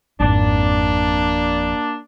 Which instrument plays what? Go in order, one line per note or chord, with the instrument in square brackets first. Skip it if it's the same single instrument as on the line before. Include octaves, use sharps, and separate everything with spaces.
[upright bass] G#1 F2 [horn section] A#3 D4